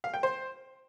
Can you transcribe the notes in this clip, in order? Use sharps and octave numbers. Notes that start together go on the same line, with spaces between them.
F5
G5
C5